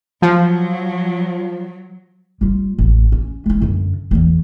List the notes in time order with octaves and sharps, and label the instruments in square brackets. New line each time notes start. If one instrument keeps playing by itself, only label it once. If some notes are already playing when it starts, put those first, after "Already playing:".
[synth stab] F3 [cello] F#3
[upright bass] G3 F4
A1 E2
C#4
G#3 E4
F#2 D3
D1 E2